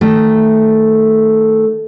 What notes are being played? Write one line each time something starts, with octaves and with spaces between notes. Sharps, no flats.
D#3 A3